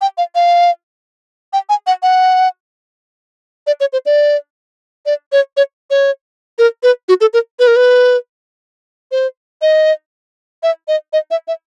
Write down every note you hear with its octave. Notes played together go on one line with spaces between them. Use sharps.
G5
F5
F5
G5
G#5
F#5
F#5
D5
C#5
C5
D5
D5
C#5
C#5
C#5
A#4
B4
F#4
A4
A#4
B4
A#4
B4
C5
D#5
E5
D#5
D#5
E5
E5